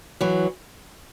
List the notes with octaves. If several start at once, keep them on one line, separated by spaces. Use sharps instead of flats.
E3 F#3